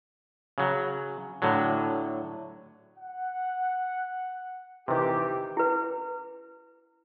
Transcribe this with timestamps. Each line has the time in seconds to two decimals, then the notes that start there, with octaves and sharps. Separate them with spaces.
0.58 C#3 F#3
1.42 A2 D3 F#3
2.98 F#5
4.88 C3 D#3 E3 G4
5.57 E4 B4